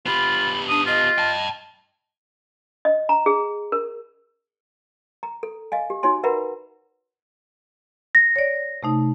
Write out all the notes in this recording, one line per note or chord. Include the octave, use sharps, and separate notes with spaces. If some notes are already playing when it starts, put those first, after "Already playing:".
B3 F4 G4 B5
D4 D#6
F4 D#5
G5 A5
D#5
A#5
G#4
A#4
A#5
A4
D#5 F5 G#5
G4
D#4 F#4 C#5 G#5 C6
A#4 B4 E5 F#5 A#5 B5
A#6
C#5 D5
C3 A3 D#4